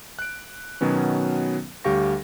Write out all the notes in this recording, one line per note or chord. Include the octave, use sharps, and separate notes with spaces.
F#6 D7
B2 D#3 F#3 B3 C#4
D2 G3 G4 F5 C#6 A#6